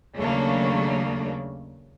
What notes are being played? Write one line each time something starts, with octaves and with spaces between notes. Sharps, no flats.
D#2 C#3 F#3 A3 A#3 D4